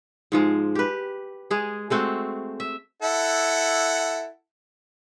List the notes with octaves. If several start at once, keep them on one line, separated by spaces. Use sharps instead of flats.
G#2 F3 G#3
G4 B4
G#3 G#4
G#3 A3 C4 F#4
E5
E4 A4 F#5